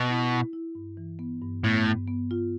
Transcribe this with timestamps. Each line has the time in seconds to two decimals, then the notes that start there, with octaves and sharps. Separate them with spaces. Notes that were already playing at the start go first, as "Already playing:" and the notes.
Already playing: B2
0.09 E4
0.31 E4
0.53 E4
0.75 G2
0.97 E3
1.19 B3
1.42 G2
1.64 A2 B3
1.86 G2
2.08 B3
2.31 F4